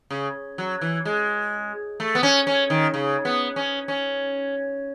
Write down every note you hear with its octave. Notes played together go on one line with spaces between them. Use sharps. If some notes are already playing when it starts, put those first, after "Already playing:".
C#3
F#3
E3
G#3
A3
B3
C#4
C#4
D#3
C#3
B3
C#4
C#4